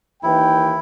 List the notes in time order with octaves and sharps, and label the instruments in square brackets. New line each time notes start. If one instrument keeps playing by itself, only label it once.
[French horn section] D#2 D#3 E3 [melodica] E4 [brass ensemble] G5